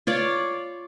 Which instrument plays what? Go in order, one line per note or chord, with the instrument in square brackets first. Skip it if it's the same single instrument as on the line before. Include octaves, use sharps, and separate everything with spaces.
[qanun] F4 C#5 D5